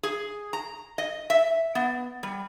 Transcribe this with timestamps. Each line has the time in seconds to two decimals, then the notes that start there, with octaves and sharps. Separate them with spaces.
0.03 G#4
0.53 A#5
0.98 D#5
1.30 E5
1.75 B3
2.23 G3